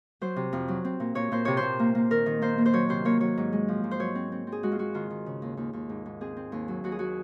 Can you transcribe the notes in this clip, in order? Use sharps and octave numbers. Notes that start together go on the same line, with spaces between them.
F#3 C5
C3
F2
F#3
C4
A#2
A#2 C#5
A#2 C5
C3 C#5
C5
C3
A#3
A#3
D#3 A#4
D#3
A#3 C5
A#3
C5
F#3 C#5
C3 C5
A#3 C#5
F#3 C#5
G#2
G#3
F3
G#2
C5
F#3 C#5
C4
C4
C4
G#4
G#3 F#4
F4
G#3 F#4
D#3 F4
D#3
C#3
D#2
D#2
D#2
G#2
G#2
C4 G#4
C4
D#2
F#3
D#2 F#4
G#4
F#3 F#4